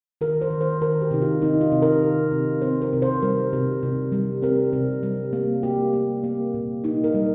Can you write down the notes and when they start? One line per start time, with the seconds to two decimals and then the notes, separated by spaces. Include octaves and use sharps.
0.21 D#3 A#4
0.41 C5
0.50 D#3
0.61 C5
0.81 D#3 A#4
1.01 G4
1.11 C3 D#4
1.22 F4
1.42 C4 D#4
1.61 F4
1.72 C3
1.82 A#4
2.01 D#3
2.31 C3
2.62 C4 C5
2.82 A#4
2.93 C3
3.02 C5
3.22 G3 A#4
3.53 C3
3.83 C3
4.12 G3
4.42 C4 A#4
4.73 C3
5.03 G3
5.33 A#3
5.63 A#3 G4
5.94 A#3
6.24 A#3
6.54 A#2
6.84 A#3 D#4
7.04 A#4
7.14 G3